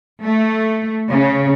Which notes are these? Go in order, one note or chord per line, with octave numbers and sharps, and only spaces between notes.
A3
C#3